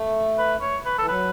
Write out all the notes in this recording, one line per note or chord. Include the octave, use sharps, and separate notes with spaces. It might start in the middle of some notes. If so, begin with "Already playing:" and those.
Already playing: A3
B4
C#5
B4
E3 A4
F#3 B4